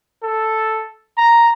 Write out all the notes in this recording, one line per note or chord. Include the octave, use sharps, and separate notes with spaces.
A4
A#5